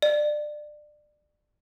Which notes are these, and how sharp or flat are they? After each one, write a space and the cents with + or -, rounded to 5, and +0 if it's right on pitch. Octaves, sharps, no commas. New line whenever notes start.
D5 +25